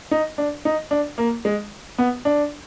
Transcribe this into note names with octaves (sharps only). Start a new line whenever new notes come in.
D#4
D4
D#4
D4
A#3
G#3
B3
D4